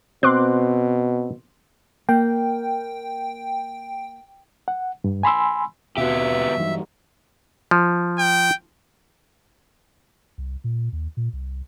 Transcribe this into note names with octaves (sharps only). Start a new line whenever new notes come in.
B2 C4 C6 D6 F#6
A#3 G5
F#5
G2
G#5 B5 C6 E6
D#2 B2 B3 C4 F#4 G4 E5 F5
G2 E3 F#3 G3 D#4
F3
G5
C2
A#2
D#2
A#2
C2